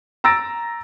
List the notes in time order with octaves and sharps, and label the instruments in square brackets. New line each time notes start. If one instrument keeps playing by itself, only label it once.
[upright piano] A#5 E6 A6 A#6 D7